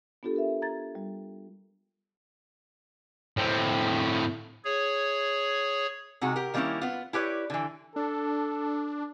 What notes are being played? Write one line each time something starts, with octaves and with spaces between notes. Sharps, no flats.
B3 D4 F4 G4 A4
A4 A#4 E5
A#5 G#6 A6
G3
A2 C4
G#4 C#5
C3 G#3 D#4 F#4
G4 A#4
D#3 G3 A#3 C4 C#4 E4
B3 F4
E4 G4 B4 C#5 D5
D3 E3
D4 A4